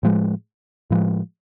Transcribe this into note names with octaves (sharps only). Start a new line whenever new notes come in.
A2 F3 G#3
A2 F3 G#3